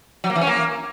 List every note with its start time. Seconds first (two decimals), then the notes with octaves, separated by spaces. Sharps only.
0.24 F#3
0.30 A#3
0.35 E3
0.41 C#4
0.47 A#3